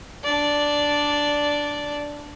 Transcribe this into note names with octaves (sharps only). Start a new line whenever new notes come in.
D4 D5